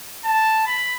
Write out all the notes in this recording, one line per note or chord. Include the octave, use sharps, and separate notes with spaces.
A5
B5